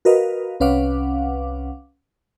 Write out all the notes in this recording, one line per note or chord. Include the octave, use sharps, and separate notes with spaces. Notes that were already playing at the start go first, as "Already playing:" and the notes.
F#4 A#4 B4 D#5 F5
C2 C#4 B4 F5 F#5 D6